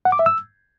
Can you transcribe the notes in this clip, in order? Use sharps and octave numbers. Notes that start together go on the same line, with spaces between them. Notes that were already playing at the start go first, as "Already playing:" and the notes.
F#5
D6
E5
E6